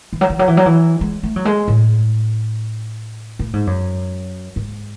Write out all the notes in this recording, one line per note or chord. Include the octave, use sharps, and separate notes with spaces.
E3
F#3
E3
F#3
E3
F#3
E3
G#3
A3
F#3
G#3
A2
A2
G#2
F#2
G#2